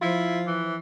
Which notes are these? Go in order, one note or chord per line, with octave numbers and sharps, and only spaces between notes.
F3 E4 F4
E3